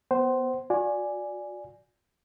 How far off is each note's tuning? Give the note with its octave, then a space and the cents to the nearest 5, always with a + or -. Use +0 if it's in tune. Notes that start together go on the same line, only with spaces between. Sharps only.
B3 +0 C5 +0 F#5 +40
F#4 -40 D5 +0 G#5 +0